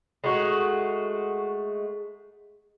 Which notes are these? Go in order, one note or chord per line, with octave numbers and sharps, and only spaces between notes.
G#3 A3 D#4 F#4